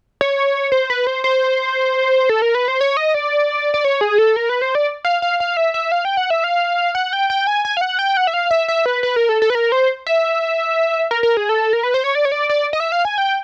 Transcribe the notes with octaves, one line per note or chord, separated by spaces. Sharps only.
C#5
C5
B4
C5
C5
A4
A#4
B4
C5
C#5
D#5
D5
D5
C#5
G#4
A4
A#4
B4
C5
D5
F5
F5
F5
E5
E5
F5
G5
F#5
E5
F5
F#5
G5
G5
G#5
G#5
F5
F#5
G5
F#5
E5
F5
E5
E5
B4
B4
A#4
A4
A4
B4
A#4
C5
E5
A#4
A#4
G#4
A4
A#4
B4
C5
C#5
D5
C#5
D5
D5
D#5
E5
F5
G#5
G5